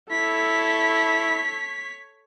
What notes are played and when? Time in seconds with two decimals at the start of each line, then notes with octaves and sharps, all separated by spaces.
0.11 E4 A4 C#5 B6